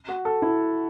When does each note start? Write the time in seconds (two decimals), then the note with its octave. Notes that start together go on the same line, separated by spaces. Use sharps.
0.09 F#4
0.25 A4
0.42 E4